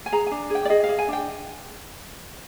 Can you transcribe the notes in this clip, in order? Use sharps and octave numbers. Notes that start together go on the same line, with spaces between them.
G#5
G#4 A#5
D4 G#5
G#4
G5
D5
G#4 D#5
F5
G#4
G#5
D4 G5